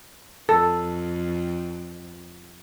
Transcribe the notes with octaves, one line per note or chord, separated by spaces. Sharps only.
F2 A4